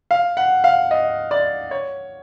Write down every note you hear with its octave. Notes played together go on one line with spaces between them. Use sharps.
F5
F#5
F5
D#5
D5
C#5